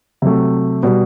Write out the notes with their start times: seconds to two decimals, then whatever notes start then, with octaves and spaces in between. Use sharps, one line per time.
0.22 C3 F#3 A3
0.83 B2 G3